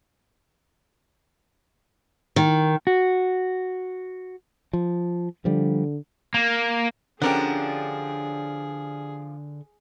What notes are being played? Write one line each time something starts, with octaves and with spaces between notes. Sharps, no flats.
D#3
F#4
F3
D3 F3 G3
A#3
D3 F3 C#4 D4 G4 G#4 A#4 F#5